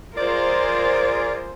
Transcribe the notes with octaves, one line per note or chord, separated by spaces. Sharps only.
F4 G#4 A#4 C5 D5